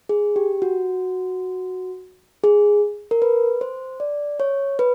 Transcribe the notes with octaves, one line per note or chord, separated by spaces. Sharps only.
G#4
G4
F#4
G#4
A#4
B4
C5
D5
C#5
B4